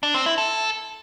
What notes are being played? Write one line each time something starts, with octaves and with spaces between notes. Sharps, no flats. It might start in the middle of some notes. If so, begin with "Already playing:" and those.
D4
C4
E4
A4